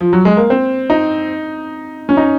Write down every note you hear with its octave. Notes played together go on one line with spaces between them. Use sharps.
F3
F#3
G#3
A#3
C4
D#4
C#4
D#4